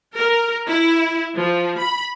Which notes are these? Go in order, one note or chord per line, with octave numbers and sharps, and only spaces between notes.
A#4
E4
F3
B5